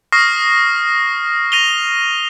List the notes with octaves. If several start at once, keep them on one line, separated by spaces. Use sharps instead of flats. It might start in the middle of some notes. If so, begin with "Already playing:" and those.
C#6 D#6 F6 A#6 C7
A#6 D#7 F7 G7